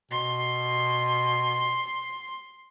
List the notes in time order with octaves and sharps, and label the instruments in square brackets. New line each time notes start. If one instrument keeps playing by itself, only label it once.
[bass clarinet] B2 [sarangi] C6